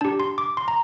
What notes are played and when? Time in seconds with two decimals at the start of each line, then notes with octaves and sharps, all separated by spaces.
0.01 D4 G4 A5
0.20 C6
0.38 D6
0.57 C6
0.68 A#5